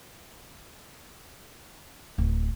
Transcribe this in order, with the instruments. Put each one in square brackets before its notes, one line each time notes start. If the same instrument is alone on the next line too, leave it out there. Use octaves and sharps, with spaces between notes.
[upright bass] D1